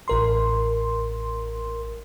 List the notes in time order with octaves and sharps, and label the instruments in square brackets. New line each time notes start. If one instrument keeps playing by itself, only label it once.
[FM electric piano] A1 A#4 C6